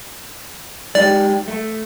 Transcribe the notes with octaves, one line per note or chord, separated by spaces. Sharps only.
G#3 D#4 G4 D5
A3